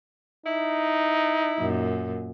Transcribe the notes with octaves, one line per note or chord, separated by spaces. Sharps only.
D#4 E4
F#2 A#2